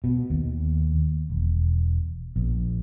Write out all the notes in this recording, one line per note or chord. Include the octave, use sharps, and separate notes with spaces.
B2
D#2
E1
A#1